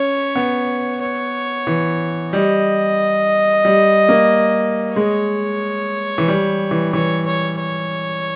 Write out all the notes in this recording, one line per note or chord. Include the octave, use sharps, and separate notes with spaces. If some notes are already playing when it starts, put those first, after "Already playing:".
Already playing: C#4 C#5
B3
C#5
E3
G3 D#5
G3
A#3
G#3 C#5
E3
G3
E3
E3 C#5
C#5
C#5